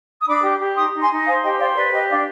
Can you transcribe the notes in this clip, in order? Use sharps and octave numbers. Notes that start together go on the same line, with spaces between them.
D#6
D4 B5 D6
G4
G4
D#4 C6 D#6
D#4
G#5 C6
D#4
C5 F5 G#5
G4 D#5 G5
C5 D5 F5
B4 D5
G4 D#5
D4 D5 F5